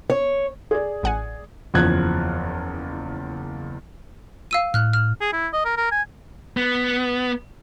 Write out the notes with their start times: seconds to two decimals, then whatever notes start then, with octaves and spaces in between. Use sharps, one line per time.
0.10 C#5
0.71 G#4 D5
1.03 A1 F#5 G#5
1.74 F#1 E2 F3 F#6 G#6
4.51 F5 E6 D#7
4.74 A2 F6 F#6
4.93 F6
5.21 G#4
5.33 E4
5.53 D#5
5.65 A#4
5.77 A#4
5.92 G#5
6.57 B3